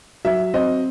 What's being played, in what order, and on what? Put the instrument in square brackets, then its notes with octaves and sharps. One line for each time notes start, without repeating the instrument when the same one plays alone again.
[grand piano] F#3 E5
C4 D#5